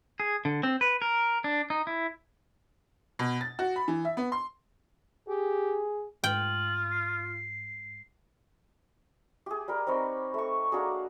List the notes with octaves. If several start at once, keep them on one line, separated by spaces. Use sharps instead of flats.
G#4
D3
C4
B4
A#4
D4
D#4
E4
B2
A6
F#4
B5
E3
E5
B3
C6
G4 G#4
G#2 F4 G5 F#7
C7
G4 G#4
G3 A#4
C4 D#4 B4 C#5
A3 C#6
A#3 D4 F#4 G#4